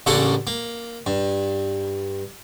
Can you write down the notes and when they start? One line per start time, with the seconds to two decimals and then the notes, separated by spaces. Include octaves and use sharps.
0.06 A1 C#3 A#3 D4 A4 F#5
0.47 A#3
1.06 G2